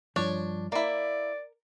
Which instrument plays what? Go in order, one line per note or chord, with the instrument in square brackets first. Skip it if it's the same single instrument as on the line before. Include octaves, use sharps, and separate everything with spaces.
[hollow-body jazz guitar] G2 F3 [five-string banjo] D4 C#5
[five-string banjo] A#3 E4 [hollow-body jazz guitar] A#4 [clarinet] D5